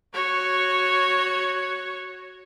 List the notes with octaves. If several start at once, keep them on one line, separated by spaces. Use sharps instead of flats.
F#4 C#5